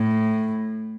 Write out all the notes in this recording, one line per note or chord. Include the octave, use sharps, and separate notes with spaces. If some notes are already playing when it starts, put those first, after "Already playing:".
Already playing: A2